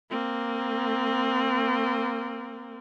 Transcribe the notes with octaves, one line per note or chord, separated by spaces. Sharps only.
A#3 C4